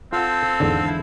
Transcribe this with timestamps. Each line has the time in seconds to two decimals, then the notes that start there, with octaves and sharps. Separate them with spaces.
0.13 C4 F4 A4 F5 F#5
0.60 E2 G#2 D3
0.87 E4